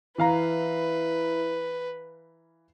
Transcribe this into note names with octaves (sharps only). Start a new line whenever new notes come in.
E3 E4 B4 F5 A#5